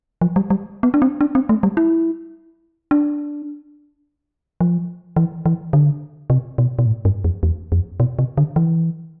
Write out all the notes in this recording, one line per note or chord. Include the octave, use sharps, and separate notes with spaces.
F3
G3
G3
B3
D4
C4
D4
C4
A3
G3
E4
D4
F3
E3
E3
D3
C3
B2
B2
A2
G2
F2
E2
F2
B2
C3
D3
E3